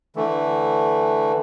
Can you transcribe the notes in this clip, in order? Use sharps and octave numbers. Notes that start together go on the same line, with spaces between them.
D3 E3 A3